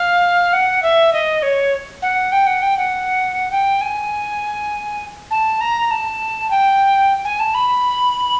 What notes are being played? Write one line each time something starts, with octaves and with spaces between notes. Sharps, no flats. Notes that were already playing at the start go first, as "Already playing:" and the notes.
Already playing: F5
F#5
E5
D#5
C#5
F#5
G5
F#5
G5
F#5
G5
G#5
A5
A#5
A5
G5
G#5
A5
B5